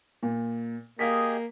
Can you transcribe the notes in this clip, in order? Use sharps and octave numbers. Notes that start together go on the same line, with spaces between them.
A#2
A#3 G4 G#4 D#5 F5 B6